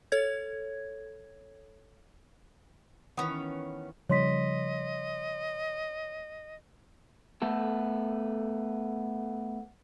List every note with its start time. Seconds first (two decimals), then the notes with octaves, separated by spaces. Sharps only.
0.12 A4 C#5 G#6
3.17 D#3 E3 B3 C#4 F#5 D#6
4.10 C#3 F3 G3 C#5 D#5 C6 B6
7.42 A3 B3 A4